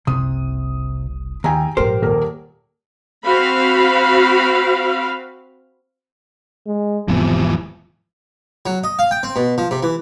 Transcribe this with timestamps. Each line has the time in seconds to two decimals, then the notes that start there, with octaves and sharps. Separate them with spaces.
0.07 F#1 C2 C3 D#6
1.44 D#2 G5 G#5 A#5
1.77 A#1 G#2 G4 A#4 C5
2.02 D#1 A#3 A#4
3.25 C4 F#4 F5 B5
6.66 G#3
7.08 E1 G#2 C3 E3 F3 B3
8.66 F#3
8.84 D#5
8.99 F5
9.11 G5
9.23 C4
9.36 B2
9.58 F3
9.71 C3
9.83 E3